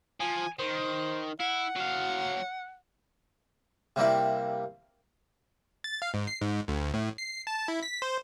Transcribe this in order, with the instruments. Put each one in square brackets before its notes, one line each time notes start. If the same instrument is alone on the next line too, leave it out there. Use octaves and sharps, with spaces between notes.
[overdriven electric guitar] F3 [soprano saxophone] G#5
[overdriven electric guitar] D#3 [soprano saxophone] C5
[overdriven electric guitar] E4 [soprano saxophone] F#5
[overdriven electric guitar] F#3 F5
[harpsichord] C3 G3 A#3 E4
[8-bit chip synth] A6
F5
G#2
C7
G#2
D2
A2
C7
A5
E4
B6
C5